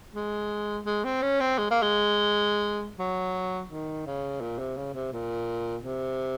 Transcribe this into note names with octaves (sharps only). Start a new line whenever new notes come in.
G#3
G#3
C4
C#4
C4
G#3
A#3
G#3
F#3
D#3
C#3
A#2
C3
C#3
C3
A#2
C3